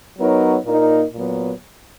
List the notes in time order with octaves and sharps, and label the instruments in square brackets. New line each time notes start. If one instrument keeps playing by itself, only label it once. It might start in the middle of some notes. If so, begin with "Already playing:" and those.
[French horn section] F#3 B3 D#4 A#4 C#5
A#2 A#3 D#4 A#4
A#2 F#3 B3